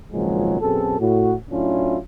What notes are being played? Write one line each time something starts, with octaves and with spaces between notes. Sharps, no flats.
G#1 C#2 A#2 F3 F#3 G#3
F#2 B2 C4 G#4 A4
A2 F#4
A2 F#3 C#4 D4 E4 F4